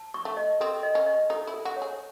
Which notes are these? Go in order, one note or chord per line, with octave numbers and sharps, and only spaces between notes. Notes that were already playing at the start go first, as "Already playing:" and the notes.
Already playing: A5
C#6
A3
D#5
C4 A4
D#5
C#4
D#5
D#4 A4
E4
A4
F#4
C#5
G#4